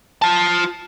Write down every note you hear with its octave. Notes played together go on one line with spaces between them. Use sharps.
F4 A5